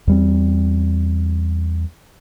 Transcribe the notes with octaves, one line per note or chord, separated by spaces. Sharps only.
E2 G3 C4